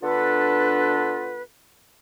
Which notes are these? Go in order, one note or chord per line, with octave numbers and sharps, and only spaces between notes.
D3 B3 D4 F4 A4 B4